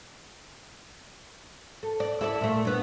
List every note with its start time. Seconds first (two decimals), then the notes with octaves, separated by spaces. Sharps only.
1.83 A4
2.00 D5
2.21 E4 A4 D5
2.41 A#2 A3
2.65 G2 B3